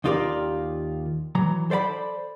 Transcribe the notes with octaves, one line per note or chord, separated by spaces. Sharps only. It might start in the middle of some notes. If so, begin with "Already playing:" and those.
D#2 D#4 F4 G4 A#4 D5
E3 F#3 A#5
A4 C5 D5 F#5 B5